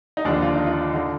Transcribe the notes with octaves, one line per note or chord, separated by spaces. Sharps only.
D#4
D#2 D3 F3 D4
F4
D#4
F4
D3 D#4